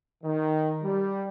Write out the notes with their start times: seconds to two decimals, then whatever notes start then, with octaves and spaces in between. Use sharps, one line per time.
0.24 D#3
0.82 G3